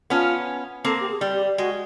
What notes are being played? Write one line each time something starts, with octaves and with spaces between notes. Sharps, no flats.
B3 C#4 F4
A#3 C4 A4
G4
G#4
G3
G4
G#3 F#4